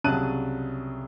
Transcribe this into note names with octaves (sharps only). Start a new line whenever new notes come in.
C2 C#3 F#3 A5 F#6 D#7